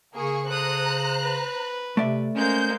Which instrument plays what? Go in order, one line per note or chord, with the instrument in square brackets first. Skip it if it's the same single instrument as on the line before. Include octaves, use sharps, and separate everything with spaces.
[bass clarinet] C#3 [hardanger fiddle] A#3 [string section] G#4 C#6
[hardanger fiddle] A4 D#6 [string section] C5 A#5 F#6
[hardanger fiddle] B4
[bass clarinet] C3 [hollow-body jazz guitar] A3 D5 E5
[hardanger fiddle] G#3 A#3 [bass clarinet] C#4 [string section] C5 G6